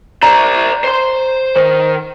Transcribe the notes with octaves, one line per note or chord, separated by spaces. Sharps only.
C5 D5 A#5
C5 C6
D#3 C5